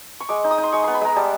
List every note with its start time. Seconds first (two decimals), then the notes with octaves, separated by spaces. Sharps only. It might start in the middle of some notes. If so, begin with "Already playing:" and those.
0.20 C#6
0.29 G#3 D6
0.44 D#4
0.51 D#6
0.58 D#4
0.63 C6
0.72 G#3 C#6
0.84 B3 C6
0.94 B5
1.01 G#3 A#5
1.16 G3 A5